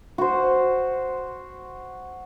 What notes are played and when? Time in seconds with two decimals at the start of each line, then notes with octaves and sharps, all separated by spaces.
0.18 F#4 C5